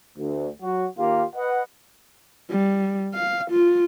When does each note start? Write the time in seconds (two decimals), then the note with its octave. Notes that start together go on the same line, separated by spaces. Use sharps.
0.18 D2
0.62 F#3 F#4
0.98 D#2 D#3 A#3 F4 G4 F5
1.36 B4 D#5 F#5
2.50 G3
3.15 F5
3.50 F4